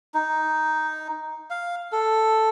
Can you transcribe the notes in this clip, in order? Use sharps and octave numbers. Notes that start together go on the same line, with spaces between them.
D#4
F5
A4